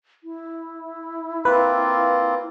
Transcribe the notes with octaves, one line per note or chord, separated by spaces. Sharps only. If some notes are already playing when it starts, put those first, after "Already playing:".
E4
A#3 C4 F4 B4